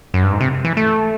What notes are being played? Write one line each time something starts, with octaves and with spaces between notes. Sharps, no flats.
F#2
G2
G#2
C3
E3
A3